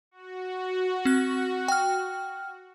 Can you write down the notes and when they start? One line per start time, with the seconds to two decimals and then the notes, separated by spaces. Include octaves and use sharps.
0.11 F#4
1.05 C4 F#6
1.68 G5 F6